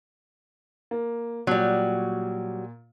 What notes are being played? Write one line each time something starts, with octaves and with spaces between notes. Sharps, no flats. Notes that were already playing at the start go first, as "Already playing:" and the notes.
A#3
A#2 F#3 G3